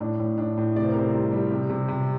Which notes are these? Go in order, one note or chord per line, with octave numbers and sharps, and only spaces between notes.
A2 D4
A2
A2 D4
A2
C3 D5
C5
A#4
C3 C5
G3
G3
C3
C3
C3